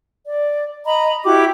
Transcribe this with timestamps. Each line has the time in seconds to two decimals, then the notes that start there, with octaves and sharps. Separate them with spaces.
0.25 D5
0.85 D#5 A#5 B5
1.24 E4 F#4 G4 D6